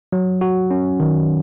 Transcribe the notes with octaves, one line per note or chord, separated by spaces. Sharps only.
F#3
F#4
C#4
D#3